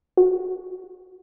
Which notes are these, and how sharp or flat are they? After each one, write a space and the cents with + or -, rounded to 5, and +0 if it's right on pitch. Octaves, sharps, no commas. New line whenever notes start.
F#4 +5